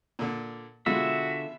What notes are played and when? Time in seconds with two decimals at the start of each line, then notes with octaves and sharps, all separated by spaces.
0.19 A#2 D3
0.86 B2 D3 G#3 F4 F#4 E5